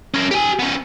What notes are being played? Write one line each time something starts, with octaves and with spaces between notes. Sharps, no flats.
C#4 A#4
G4 G#5
B3 C#4